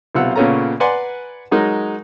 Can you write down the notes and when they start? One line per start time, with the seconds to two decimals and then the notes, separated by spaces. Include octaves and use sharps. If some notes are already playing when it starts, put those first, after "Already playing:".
0.15 B1 C3 B3 F4 F#5 E6
0.36 A#2 C#3 B3 C#4 A4 A#5
0.80 B4 D5 F#5 G#5 A#5 C6
1.51 F#3 G#3 D#4 A#4